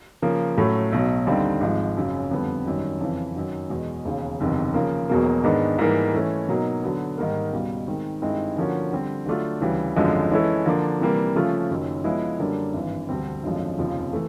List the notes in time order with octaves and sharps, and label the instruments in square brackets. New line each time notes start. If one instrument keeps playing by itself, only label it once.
[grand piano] C#3 F3 A#3
A2 F#3 A3 C#4
B1 B2 F#3
D#2 D3 G3 C4 D#4
G#1 G#2 F3 G#3
F#1 F#2 C#3
F2 D3 G3 B3
G#1 F#2 D#3 G3
F2 C#3 E3
F#2 D#3 F#3
E2 B2 G#3
E1 D#2 C#3
F#1 E2 C3 D#3
C#3 F3 A#3
E1 E2 B2 F#3 A#3
G#2 D#3 G#3 B3 D4
G#2 E3 G3 A#3
E3 A3 C#4
B2 F#3 A#3 D#4
D3 F#3 B3
G#2 D#3 G3 A#3
C#2 B2 G3
D#3 G#3 C4
G2 D#3 G#3 C4 E4
D3 F3 A#3 C#4 F#4
D3 G3 C4
D3 F#3 A3 D4 F4
D2 C#3 E3 G3
G#1 F#2 D3 F3 G#3
E3 G#3 C#4 E4 A4
D3 F3 A#3 D4
C3 E3 G3 A#3
C#3 F3 A3 C#4 F4
F#1 F#2 D#3
C#3 F3 G#3 B3 E4
F#2 D3 G3 A#3 D4
G#1 G2 E3
E1 D2 D3 G3 C4
G#1 F#2 D3 F3 G#3
F1 D#2 C#3 F3
E3 A3